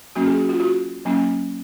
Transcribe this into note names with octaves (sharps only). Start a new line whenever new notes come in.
F#3 A#3 C#4 F#4
G#4
F#4
F4
F#4
F#3 A#3 C#4